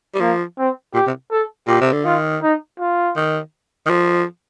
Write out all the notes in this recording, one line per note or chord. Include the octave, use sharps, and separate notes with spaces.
G3
F3 A#3
C4
A#2 G4
C3
A4
A#2 G4
C3
D3
D#3 F4
D#4
F4
D#3
D#3
F3